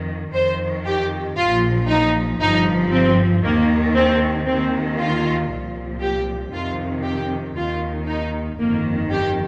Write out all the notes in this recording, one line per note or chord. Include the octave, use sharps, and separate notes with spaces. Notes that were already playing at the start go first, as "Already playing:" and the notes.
Already playing: F2 D#3
F2 D#3 C5
G4
A#1 A#2 F3 F4
D#4
G1 G2 F3 D#4
C4
D#2 D#3 A#3
C4
D#2 D#3 C4
F4
C2 A#2 F3
G4
F2 C3 D#3 F4
G4
D#2 D#3 F4
D#4
G1 F2 D#3 A#3
G4